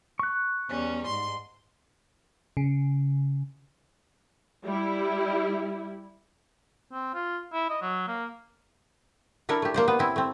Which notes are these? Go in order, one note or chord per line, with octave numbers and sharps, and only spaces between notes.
C#6 F#6
E2 G3 C#4
G#2 C6
C#3
G3 E4
C4
F4
E4
D#5
F#3
A#3
D4 E4 A4 A#4
A3 G4
A#3 C5 D5
B3
C4 E4
A3 C4